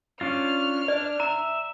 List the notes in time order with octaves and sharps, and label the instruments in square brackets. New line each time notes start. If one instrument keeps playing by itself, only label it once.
[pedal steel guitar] C#4 D4 F4 [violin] F6
[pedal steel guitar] D4 [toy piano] D5
[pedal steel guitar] E5 [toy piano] A#5